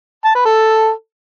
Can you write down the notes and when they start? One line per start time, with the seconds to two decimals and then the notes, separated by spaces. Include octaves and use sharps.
0.25 A5
0.35 B4
0.45 A4